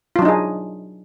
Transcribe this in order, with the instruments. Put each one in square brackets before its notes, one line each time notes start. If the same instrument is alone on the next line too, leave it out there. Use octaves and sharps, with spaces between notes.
[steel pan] F4
F#3
D4
D#4
G#4